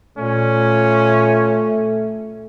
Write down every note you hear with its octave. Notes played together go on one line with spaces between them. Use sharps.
A#2 A3 C#4